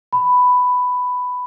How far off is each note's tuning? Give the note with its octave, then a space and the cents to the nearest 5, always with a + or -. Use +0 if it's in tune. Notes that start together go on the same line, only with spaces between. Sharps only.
B5 +10